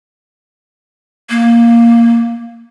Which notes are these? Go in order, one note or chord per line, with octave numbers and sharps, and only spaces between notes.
A#3